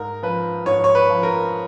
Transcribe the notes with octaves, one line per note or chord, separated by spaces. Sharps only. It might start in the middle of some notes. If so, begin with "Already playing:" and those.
Already playing: G#2 A#4
F3 B4
G#2 C#5
C#5
B4
F3
A#4